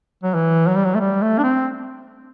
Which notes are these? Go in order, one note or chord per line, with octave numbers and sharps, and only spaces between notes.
F#3
E3
F#3
G3
F#3
A3
G3
A3
D4
C4